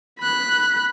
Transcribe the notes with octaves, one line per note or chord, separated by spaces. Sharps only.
B5 F#6